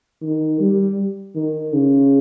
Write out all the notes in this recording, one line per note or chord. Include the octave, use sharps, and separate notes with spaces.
D#3
G3
D#3
C#3